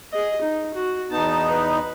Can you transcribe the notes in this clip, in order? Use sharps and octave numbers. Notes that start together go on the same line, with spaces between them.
G#4 D#5
D#4
F#4
E2 B3 D#4 A5
B4